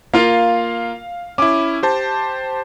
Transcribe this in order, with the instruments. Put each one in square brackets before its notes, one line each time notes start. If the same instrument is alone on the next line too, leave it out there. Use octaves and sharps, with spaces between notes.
[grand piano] A#3 F4 [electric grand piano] F5
[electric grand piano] C#4 E4 [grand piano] D6
[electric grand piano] G4 C5 A5